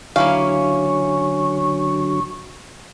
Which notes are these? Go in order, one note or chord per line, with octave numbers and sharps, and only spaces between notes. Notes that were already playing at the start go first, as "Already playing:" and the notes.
D3 F#3 A#3 C#4 E4 F5 C#6